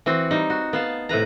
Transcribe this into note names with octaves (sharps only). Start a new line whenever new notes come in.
E3 C4 F#4
G3 D#4
F#4
B3 F5 A5
A2 C3 B4 A#5